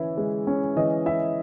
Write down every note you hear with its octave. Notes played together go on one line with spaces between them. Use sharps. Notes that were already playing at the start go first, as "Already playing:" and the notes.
Already playing: E3 C#4 E4
G#3
C#4
E3 D#5
E4 E5